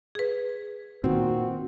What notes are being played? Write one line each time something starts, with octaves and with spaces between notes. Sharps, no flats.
G#4 B4
A#2 D#3 C4 F#4